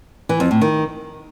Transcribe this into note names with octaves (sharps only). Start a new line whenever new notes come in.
E3
F2
A2
D#3